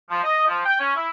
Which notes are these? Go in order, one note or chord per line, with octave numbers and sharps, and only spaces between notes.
F3
D#5
F3
G5
C#4
E4